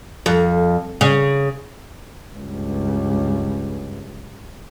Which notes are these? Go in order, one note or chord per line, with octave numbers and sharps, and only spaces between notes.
F2
C#3
C#2 G2